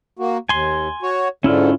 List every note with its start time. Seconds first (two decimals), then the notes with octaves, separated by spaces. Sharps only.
0.19 A#3 F#4
0.49 D#2 G#5 C6
1.02 F#4 C#5
1.44 G#2 D3 C#4 E4 F4